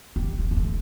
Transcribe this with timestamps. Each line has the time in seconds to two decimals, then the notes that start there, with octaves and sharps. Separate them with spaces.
0.16 G3
0.39 G#3
0.51 G#3
0.56 A3